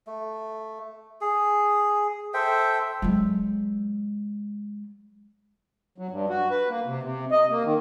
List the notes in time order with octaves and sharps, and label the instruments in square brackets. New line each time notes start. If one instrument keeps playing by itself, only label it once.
[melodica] A3
G#4
A4 C5 E5 G5
[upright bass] F#3 G#3
[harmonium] F#3
G2
F#4
B4
A#3
C3
C3
D#5
A#3
D#3